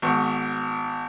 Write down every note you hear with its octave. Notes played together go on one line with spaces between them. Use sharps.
G#1 B3 C#6